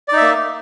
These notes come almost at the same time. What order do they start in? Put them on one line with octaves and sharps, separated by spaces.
D5 D#4 E5 A#3